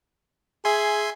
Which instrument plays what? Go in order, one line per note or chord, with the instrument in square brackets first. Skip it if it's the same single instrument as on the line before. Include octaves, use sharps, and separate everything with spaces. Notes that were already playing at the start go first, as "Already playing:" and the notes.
[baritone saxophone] G#4 [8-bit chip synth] E5 G#5 C6